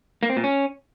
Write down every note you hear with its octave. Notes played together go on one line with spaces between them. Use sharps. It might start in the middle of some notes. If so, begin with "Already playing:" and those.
A#3
C4
A#2
C#4